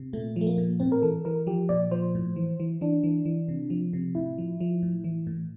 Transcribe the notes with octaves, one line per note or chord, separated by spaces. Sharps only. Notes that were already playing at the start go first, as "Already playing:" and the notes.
Already playing: C3
A#2 A3
F3 A3
A#3
A#2
A2 C4
A#4
E3 A4
E3 A#4
F3 G4
A#2 D5
F3 C5
A2
E3
E3
E3 D4
E3
E3
C3
F3
C3
A2 E4
F3
F3
A2
E3
A2